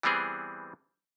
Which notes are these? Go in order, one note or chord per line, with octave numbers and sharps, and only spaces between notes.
E3 G3 B3 C4 G#4